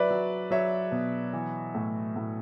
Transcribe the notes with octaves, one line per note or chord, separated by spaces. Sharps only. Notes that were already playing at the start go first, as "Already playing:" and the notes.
Already playing: F#3 B4 D5 E5
F#3
F#3 C#5 E5
B2
E3
A2
A2